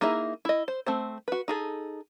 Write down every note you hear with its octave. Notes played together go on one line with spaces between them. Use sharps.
A#3 D#4 E4 G#4 E5
E4 D#5
C5
A3 C4 C5
F#4 B4
D#4 G#4 A4